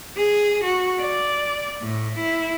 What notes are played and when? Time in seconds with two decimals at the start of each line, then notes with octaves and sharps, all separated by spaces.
0.17 G#4
0.64 F#4
1.00 D5
1.82 A2
2.19 E4